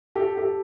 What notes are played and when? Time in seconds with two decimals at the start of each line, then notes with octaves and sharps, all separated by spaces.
0.16 G4 A4
0.37 G4 A4